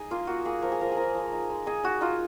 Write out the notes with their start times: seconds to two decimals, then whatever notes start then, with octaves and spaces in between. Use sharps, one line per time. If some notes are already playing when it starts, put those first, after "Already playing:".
Already playing: D#4 G#4
0.11 A#3 F4
0.27 A#3 F#4
0.45 A#3 G#4
0.62 F3 A#4
0.72 G#4
0.80 F3 A#4
0.91 G#4
0.97 F3 A#4
1.15 F3
1.32 D#4
1.50 G#3
1.66 D#4 G#4
1.84 D#4 F#4
2.01 D#4 F4